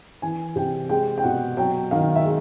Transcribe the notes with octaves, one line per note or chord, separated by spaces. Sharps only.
E3 G#5
C3 G5
G#3 G5
G5
B2 F#5
F#3 G5
D#3 F5
E5
G#3